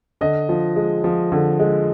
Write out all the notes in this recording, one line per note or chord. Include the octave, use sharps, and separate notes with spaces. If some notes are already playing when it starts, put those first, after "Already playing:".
D3 D#5
F3
G#3
F3
D3
G#3